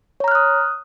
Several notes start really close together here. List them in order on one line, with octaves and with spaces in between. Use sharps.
C#5 A#5 F6 F#6 D#6